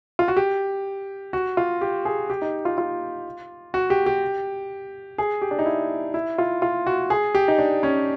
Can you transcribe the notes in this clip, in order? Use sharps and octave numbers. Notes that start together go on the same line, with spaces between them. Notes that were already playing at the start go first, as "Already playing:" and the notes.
F4
F#4
G4
F#4
F4
G4
G#4
G4
D#4
F4
F4
F#4
G4
G4
G#4
G4
D4
D#4
E4
E4
F4
F4
F#4
G#4
G4
D#4
D4
C#4